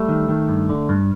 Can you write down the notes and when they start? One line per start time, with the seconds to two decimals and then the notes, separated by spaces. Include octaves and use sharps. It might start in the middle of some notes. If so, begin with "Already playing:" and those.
Already playing: G3 A3
0.08 D#3
0.29 D#3
0.49 G2
0.69 D3
0.89 G2